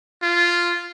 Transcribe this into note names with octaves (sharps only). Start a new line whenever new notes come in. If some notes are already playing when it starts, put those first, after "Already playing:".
F4